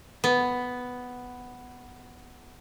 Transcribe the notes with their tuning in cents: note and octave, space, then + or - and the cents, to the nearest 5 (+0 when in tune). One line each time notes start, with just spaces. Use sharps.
B3 +5